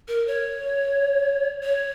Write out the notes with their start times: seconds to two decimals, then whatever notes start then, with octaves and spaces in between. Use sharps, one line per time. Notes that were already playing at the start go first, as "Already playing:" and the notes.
0.08 A#4
0.27 C#5
1.63 C#5